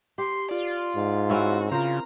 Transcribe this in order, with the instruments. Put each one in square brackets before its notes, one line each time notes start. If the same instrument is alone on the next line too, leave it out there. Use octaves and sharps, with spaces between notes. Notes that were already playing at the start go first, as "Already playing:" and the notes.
[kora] G4 [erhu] C6
[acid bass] F4 [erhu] D5
[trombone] G#2
[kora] C4 C#4 E4 [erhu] F#4
[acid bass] C#3 [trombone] F4 [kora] A#4 C5 [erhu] A#5